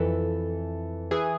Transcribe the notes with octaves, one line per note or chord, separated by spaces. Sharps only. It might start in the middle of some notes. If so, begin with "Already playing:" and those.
Already playing: F2 E3 A4
E3 G#4